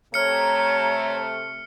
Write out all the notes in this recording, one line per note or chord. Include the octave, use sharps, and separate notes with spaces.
C3 A3 C#5 A#5 F6 C#7